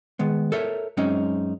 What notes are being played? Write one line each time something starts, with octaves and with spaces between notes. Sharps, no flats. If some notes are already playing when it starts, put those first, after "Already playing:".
D#3 G#3 B3
A4 A#4 C#5 E5
F#2 G#3 C4 C#4 D#4